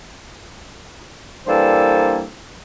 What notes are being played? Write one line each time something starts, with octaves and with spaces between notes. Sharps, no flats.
E3 G3 A#3 D4 A4 C5